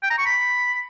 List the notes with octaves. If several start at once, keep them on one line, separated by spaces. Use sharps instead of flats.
G5
A#5
C#6
B5